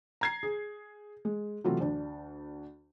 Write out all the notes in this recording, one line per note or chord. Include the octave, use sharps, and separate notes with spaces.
A#5 G#6 C7
G#4
G#3
C3 E3 F#3 A3 F4
D2 D4